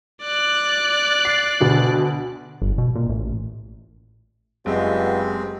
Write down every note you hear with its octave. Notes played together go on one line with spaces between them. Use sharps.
D5 F#6
C7
D2 B2
G1
B2
A#2
A1
F#1 G2 G#3 B3 C4 F4 G4 D#5